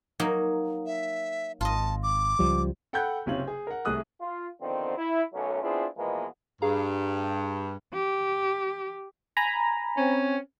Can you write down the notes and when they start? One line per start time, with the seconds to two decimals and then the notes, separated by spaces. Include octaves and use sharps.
0.20 F#3 A#3 D#4
0.86 E5
1.61 G#1 F4 D#5 A5
2.03 D6
2.39 C#2 F3 G3
2.93 A4 F#5 G5 B5 F#6 G6
3.26 F#1 C3 C#4 F4 F#7
3.47 G#4
3.67 A#4 F#5
3.85 C2 A3 G#4 D#6 F#6
4.20 F4
4.60 D3 D#3 F3 B3 C4
4.96 E4
5.33 B1 F#2 F#3 A3 C#4
5.62 B3 C4 D4 E4 F4 G#4
5.97 B2 E3 F3 G#3 A#3 B3
6.62 G2 G#4 F5 A#5
7.93 G4
9.37 G#5 A#5 B5
9.97 C4 C#4